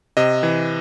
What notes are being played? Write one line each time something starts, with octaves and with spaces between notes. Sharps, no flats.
C3 D#5
E3